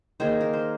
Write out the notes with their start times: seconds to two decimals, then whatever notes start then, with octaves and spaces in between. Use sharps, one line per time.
0.20 D#3 A#3 G#4 C5
0.41 A#4
0.53 C5